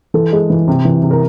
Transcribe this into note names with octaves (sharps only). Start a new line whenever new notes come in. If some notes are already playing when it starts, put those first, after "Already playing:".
E3 A4
G#3
E3
C3
E3
C3
A#4